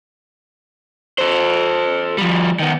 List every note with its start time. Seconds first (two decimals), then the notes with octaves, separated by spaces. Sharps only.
1.19 A4 C5
2.18 F3 G3
2.59 D#3 B3